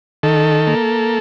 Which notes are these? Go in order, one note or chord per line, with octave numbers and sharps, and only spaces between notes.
D#3 A4
A#3